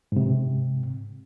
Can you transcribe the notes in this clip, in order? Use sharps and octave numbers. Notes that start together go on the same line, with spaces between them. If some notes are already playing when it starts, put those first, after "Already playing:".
G#2 C3